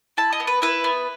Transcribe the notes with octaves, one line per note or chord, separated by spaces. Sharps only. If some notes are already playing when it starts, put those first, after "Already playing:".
E4 A5
D#5
B3
B4
E4 B4
B3